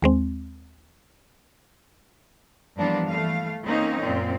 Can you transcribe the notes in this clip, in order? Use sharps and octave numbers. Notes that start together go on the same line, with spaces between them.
D#2 G#3 C4
G2 E3 F3 A#3 B3 D4
E3 A3 F5
A#3 C4 C#4 D#4
F#2 A#2 C4